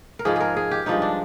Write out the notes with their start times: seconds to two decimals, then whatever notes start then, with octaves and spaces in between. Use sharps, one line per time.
0.19 A#4
0.25 G#2 F3 G#3 G#4
0.36 G#4 A#4
0.57 G#4
0.71 G4
0.86 G2 F3 G#3 D#4
1.02 D4